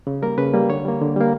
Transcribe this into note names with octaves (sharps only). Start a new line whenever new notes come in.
C#3
G3 A#3 A#4
C#3 B4
G3 A#3
D3 C#5
G3 A#3
D3
G3 A#3